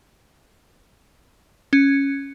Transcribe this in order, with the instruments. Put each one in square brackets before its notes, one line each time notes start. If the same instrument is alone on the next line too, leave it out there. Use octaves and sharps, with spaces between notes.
[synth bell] C#4